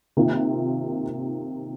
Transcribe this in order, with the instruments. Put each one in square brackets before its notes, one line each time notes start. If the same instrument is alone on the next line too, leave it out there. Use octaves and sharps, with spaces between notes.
[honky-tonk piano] C3 D#3 A#3 F4